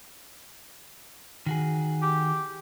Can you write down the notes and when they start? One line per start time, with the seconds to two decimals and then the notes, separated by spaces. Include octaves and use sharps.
1.46 D#3 F#4 G#4
2.02 G4